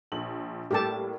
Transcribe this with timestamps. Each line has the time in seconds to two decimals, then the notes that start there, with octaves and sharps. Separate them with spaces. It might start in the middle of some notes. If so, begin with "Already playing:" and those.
0.12 A#1 F#7
0.71 A2 G3 A#3 G4 A4 A5